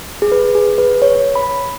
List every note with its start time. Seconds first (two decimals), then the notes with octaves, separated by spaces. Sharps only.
0.22 G#4
0.32 B4
0.55 G#4
0.78 B4
1.02 C#5
1.35 B5